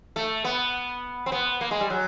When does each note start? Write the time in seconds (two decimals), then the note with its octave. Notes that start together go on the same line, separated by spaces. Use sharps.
0.16 A3
0.44 B3
1.26 C4
1.32 B3
1.61 A#3
1.71 G#3
1.80 G3
1.90 F#3